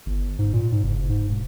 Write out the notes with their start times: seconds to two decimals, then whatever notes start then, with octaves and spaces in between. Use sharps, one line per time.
0.06 G1
0.39 G#2
0.53 A#2
0.72 G#2
0.83 F#1
1.09 G#2
1.29 E1